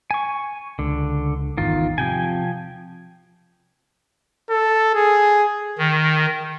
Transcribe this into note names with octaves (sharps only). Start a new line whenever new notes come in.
G#5 C#6
C#2 D3
G#1 E2 D#3 F4
C3 F3 G5 G#5
A4
G#4
D#3